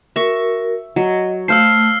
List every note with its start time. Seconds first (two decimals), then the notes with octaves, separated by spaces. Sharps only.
0.16 F#4 A#4 E5 C#6
0.96 F#3 D#5
1.48 A3 C5 F5 E6 F6 C7